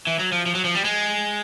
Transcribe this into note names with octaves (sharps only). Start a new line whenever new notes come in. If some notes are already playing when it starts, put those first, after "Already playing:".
E3
F#3
F3
F3
F#3
F3
G3
G#3